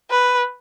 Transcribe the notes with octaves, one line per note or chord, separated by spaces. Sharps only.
B4